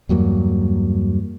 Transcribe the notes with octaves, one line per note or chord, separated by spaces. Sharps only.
E2 G2 F#3 A#3